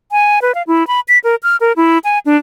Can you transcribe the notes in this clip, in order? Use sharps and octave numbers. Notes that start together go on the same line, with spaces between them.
G#5
B4
F5
E4
B5
B6
A#4
F6
A#4
E4
G#5
D4